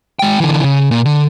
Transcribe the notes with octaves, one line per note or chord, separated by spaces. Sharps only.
G#3 G5
D3 E3
C#3
A#2
D3